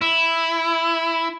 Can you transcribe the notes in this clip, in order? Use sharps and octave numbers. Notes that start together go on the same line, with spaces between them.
E4